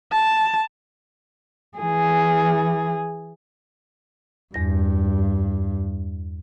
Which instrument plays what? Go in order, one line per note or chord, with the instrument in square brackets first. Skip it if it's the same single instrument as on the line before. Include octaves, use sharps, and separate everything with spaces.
[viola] A5
[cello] E3 G#4
[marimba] E2 A#6 [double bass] G2